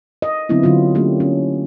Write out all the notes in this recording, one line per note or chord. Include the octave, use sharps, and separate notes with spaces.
D#5
D3 F#3 B3 C4 D4 E4
D3 F#3 B3 F4
F#3 A3 A#3 C#4 D4 G4
C#4